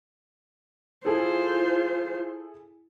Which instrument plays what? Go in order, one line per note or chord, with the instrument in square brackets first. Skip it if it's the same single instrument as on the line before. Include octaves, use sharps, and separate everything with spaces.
[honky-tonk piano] E4 G#4 A4 [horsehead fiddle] F4 C5